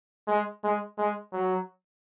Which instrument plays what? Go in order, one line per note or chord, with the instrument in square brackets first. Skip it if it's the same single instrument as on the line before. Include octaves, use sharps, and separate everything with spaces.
[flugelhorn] G#3
G#3
G#3
F#3